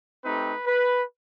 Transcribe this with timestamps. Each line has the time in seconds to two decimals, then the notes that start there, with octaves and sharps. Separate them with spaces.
0.25 A3 C4 D#4 G4 B4
0.66 B4